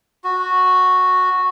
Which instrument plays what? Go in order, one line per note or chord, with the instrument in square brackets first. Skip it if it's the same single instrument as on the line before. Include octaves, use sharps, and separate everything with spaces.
[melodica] F#4